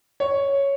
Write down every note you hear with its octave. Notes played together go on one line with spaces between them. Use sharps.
C#5